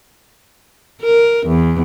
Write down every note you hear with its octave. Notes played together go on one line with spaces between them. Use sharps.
A#4
E2